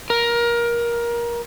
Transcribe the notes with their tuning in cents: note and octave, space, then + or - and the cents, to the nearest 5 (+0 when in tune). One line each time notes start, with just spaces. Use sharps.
A#4 +20